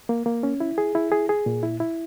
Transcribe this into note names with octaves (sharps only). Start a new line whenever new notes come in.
A#3
A#3
C#4
E4
G#4
E4
G#4
G#4
A#2
E4
E4